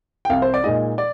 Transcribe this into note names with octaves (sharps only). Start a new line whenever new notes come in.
G5
C2 F5
C5
D5
A#2 G#3 D#4 D#5
D5